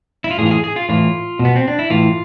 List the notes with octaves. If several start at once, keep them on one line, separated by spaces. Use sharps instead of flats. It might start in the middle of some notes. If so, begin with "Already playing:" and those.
E4
F4
A2 E3 G#4
F4
G#4
G#4
F4
A2 E3 F4
B2
B3
C4
D4
E4
A2 E3 F4